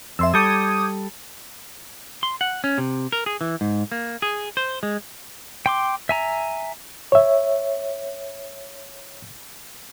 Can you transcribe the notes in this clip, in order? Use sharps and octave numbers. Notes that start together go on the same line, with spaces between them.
F2 E5 C6 E6
G3 A4 D6 D#6 G6 G#6
C6
F#5
C#4
C3
A#4
G#4
E3
G#2
A#3
G#4
C5
G#3
G5 C6 D6
E5 G#5 A#5
C#5 E5